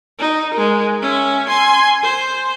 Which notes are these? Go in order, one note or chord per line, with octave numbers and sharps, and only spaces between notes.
D#4
G#3 A#4
C#4 E5
G#5 C6
C5